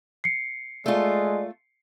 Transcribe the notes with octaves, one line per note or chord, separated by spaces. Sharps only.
C7 C#7
G#3 A3 F4 D5